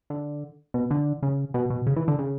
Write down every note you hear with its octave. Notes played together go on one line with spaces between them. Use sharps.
D3
B2
D3
C#3
B2
B2
C#3
E3
D3
C#3